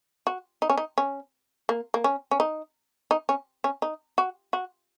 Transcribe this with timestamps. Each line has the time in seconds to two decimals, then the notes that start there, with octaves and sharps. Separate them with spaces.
0.27 F#4
0.62 D#4
0.70 C#4
0.78 D#4
0.98 C#4
1.69 A#3
1.94 A#3
2.04 C#4
2.31 C#4
2.40 D#4
3.11 D#4
3.29 C#4
3.64 C#4
3.82 D#4
4.18 F#4
4.53 F#4